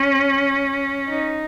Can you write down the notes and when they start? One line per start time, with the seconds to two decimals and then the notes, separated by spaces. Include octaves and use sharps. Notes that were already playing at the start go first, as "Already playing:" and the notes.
Already playing: C#4
1.09 D#4